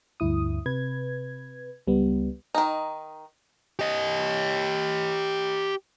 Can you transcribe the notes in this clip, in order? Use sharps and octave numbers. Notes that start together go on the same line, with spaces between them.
D2 G2 E4 D#6
C3 B4 G#6
C#2 G3 B3
D#3 D#4
G4 D#5